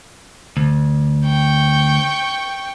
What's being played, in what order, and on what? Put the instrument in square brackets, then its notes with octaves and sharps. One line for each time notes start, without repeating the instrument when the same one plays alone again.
[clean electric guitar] D2
[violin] G5 C#6